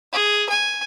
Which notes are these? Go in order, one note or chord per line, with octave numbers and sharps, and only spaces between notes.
G#4
G#5